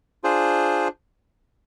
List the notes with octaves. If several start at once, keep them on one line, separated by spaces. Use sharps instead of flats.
D4 F4 G#4 C5